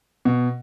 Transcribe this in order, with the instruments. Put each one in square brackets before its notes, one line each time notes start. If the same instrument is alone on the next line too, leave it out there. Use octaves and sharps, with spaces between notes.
[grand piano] B2